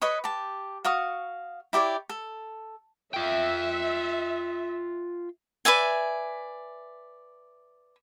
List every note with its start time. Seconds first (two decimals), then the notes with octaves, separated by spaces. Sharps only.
0.02 B4 C#5 D#5 C#6
0.24 G4 A5
0.85 F#4 F5 C#6 D#6
1.73 E4 G4 C#5 D5
2.09 A4
3.14 F4 E5 G5
5.65 B4 D5 E5 G#5